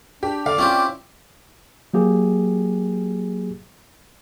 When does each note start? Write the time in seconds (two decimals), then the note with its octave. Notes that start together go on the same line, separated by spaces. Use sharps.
0.23 D4 G4
0.46 D3 D5 F5
0.58 C4 C#4 E4 F4 G4
1.94 F#3 A#3 G4 G#4